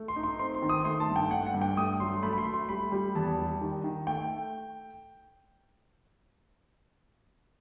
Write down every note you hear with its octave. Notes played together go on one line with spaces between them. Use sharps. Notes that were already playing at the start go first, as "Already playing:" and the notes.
Already playing: A3
C6
D#4
C6
C4 C6
C6
D#3
D#6
A3 C6
A5
G2
G5
G2 F#5
F#5
G2
G5
A3 D#6
F#3 C6
A3 B5
B5
C6
A3
C6
G3 B5
G3
E2 A5
G3
D#3
D#3
A3 G5